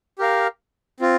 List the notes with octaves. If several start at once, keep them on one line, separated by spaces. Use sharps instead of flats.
G4 A#4 F5
C4 F4